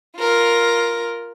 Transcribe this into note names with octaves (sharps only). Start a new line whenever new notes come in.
F4 A#4